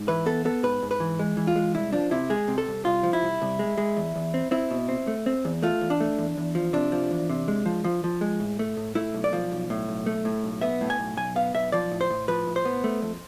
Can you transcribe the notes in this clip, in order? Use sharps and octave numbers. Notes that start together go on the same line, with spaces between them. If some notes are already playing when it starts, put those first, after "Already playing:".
Already playing: G#2
E3 B4
B3 A4
B3 A4
G#2 B4
G#2
B4
E3
G#3
E3
F4
G#3
C2 E4
F3 D4
C3 E4
G#3 G#4
C3
A4
C2
C2 F4
F3
E4
C2
C2
G#3
G#3
E2
E2
C4
C4 E4
B2
C4
A3
C4
E2
A3 F4
E2
D4
A3
E2
E2
F3
C3 D4
F3
E2
C3
G#3
F3
F3
F3
G#3
A2
A3
A2
A3 E4
B1
D5
F3
B1
A2
B1
A3
A2
B1
B3 E5
A2
G#5
B1
B1 G#5
B3 F5
B1 E5
F3 D5
A2
C5
A2
F3 B4
A2
C5
B3
A3
F2